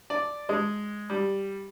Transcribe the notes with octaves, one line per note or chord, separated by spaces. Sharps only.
D5
G#3
G3